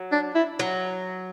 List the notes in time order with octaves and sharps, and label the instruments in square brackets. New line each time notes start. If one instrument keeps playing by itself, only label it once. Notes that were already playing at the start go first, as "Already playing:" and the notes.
Already playing: [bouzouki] F#3
[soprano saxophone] D4
E4
[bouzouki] F#3